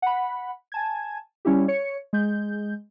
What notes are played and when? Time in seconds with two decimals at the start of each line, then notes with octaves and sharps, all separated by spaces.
0.02 F#5 B5
0.72 G#5 A5 G#6
1.45 G3 C#4 E4 G4
1.68 C#5 C#7
2.13 G#3 G6